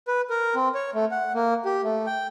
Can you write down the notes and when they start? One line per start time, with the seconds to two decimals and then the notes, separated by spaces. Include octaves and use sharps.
0.08 B4
0.30 A#4
0.55 C4
0.75 C#5
0.94 A3
1.11 F#5
1.35 A#3
1.65 G4
1.84 A3
2.07 G5